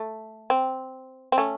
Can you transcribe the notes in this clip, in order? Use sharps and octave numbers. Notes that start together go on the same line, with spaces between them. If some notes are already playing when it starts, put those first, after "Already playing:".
Already playing: A3
C4
C4
A3 C#4